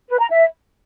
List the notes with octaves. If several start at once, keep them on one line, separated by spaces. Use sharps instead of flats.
B4
A#5
E5